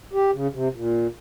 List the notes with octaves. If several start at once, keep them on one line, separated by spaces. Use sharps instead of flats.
G4
C#3
C3
A#2